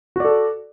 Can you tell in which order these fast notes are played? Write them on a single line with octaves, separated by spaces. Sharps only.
F#4 D5 A4